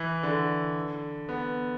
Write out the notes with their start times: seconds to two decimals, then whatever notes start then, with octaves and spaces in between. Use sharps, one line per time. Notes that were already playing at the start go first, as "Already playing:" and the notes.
Already playing: E3
0.23 D3
1.29 B3